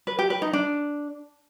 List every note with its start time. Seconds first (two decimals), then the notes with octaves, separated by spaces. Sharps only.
0.07 B4
0.19 G4
0.30 B4
0.42 D#4
0.53 D4